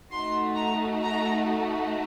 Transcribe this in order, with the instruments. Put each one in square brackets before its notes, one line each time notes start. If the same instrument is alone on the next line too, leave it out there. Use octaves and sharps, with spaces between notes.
[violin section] A3 D#4 F#4 C6
A#5
A#5